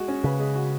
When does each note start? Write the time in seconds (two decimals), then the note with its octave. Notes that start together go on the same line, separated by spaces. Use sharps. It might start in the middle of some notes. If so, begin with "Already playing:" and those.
Already playing: G#3 F#4
0.08 C#4
0.24 C#3 B4
0.39 G#3
0.56 F#4